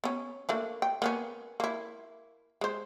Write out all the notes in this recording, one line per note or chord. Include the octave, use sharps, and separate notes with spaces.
B3 C#4
A3 A#3 D4
G5
A#3 B3 C#4
A#3 E4
G#3 C5